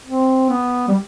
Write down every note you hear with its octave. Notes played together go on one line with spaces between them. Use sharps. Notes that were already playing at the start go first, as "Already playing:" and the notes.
C4
B3
G3